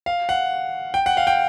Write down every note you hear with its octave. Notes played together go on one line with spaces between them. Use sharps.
F5
F#5
G5
F#5
F5
G5